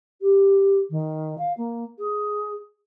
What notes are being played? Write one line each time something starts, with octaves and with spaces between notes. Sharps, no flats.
G4
D#3
F5
A#3
G#4